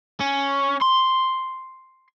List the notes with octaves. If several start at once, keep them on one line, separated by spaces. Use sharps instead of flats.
C#4
C6